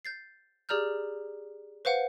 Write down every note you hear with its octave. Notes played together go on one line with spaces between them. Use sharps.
G6 A6 C7
G4 G#4 D5 A#5 F6 G6
B4 C5 F5 F#5